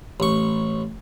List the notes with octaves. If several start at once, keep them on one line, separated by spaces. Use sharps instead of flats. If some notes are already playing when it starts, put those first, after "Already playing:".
A1 C#6